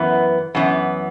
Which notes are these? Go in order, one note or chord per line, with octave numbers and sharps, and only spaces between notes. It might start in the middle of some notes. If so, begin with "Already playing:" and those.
Already playing: F#2 E3 B3
F#2 E3 B3